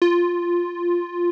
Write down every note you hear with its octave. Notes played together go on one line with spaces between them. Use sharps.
F4